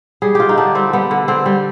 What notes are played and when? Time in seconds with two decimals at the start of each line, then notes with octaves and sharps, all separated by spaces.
0.22 G3 G#4
0.35 D3 F4 G4
0.49 D#4
0.58 D3 D4
0.75 G3 C4
0.93 G3 B3
1.11 D3
1.28 D3 C4
1.46 G3